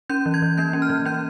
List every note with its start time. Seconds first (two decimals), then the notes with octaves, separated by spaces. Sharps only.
0.09 C#4 G6
0.26 E3
0.34 G#6
0.42 E3
0.58 A#3 G6
0.73 C#4
0.82 F6
0.90 E3
1.05 C#4 G6